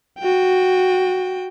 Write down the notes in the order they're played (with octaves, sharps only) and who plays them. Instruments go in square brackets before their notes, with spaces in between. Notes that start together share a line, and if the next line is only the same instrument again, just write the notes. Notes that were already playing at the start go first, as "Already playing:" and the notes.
[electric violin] F#4 G5